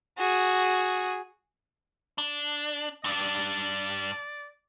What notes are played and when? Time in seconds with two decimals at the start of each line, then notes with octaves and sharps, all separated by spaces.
0.18 F#4 G#4
2.18 D4
3.04 G2 D4 D5